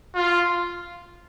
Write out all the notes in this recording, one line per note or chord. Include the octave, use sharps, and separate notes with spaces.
F4